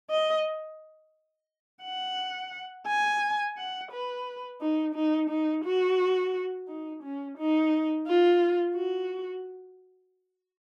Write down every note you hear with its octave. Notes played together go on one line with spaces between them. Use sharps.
D#5
F#5
G#5
F#5
B4
D#4
D#4
D#4
F#4
D#4
C#4
D#4
F4
F#4